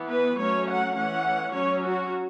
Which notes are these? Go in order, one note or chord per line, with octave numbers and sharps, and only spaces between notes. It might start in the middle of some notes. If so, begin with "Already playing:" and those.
Already playing: E3 B3
B4
F#3 A3 C#4 C#5
F#5
E3 A3 C#4 F#5
F#3 C#4 C#5
F#4